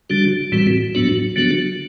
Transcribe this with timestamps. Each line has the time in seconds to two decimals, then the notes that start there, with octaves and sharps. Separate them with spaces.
0.10 D3 G3 D4 F#4
0.52 A2 E3 G3 C4 F#4
0.95 A2 F#3 B3 D4 F#4
1.36 D3 F#3 B3 D4 F#4